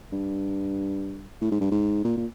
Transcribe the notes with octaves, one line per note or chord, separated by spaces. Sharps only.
G2
A2
G#2
G2
G#2
A#2
A#2